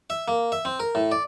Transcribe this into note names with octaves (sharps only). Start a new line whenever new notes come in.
E5
A#3
E5
C4
A#4
A2
D5